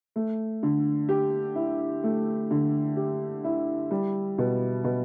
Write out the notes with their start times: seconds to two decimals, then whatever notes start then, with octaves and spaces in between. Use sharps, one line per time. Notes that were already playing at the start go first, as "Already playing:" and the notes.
0.16 A3
0.63 D3
1.09 G4
1.56 E4
2.04 A3
2.51 D3
2.96 G4
3.44 E4
3.91 G3
4.38 B2
4.84 B2